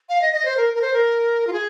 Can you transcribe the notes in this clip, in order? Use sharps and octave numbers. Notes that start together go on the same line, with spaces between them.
F5
D#5
D#5
C5
A#4
A#4
C5
A#4
F4
G#4